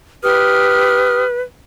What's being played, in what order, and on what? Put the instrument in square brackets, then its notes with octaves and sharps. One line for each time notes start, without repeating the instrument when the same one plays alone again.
[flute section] G4 D#6 F6 [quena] B4